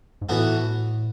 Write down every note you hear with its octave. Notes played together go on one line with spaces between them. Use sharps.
G#2
A2 E3 B3 F#4 A4